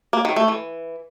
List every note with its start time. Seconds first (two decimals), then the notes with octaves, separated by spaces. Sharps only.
0.13 A#3
0.25 D#3
0.36 A3
0.48 E3